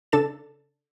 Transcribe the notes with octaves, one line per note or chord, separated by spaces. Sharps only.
C#3 D4 A4 A6 E7